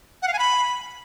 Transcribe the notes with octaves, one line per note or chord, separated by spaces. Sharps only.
F#5
F5
G#5
B5